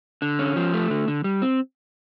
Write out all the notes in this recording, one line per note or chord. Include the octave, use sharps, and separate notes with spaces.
D3
C#4
F3
A3
D3
D3
G3
C4